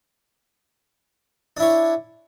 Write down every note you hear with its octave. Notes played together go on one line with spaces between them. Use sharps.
D4 E4 C#5